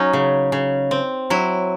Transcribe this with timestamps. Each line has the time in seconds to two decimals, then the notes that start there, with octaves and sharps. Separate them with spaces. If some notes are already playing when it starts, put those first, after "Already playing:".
Already playing: F#3 C#4 D#4
0.13 C#3
0.52 C#3
0.91 C4
1.30 F#3 E4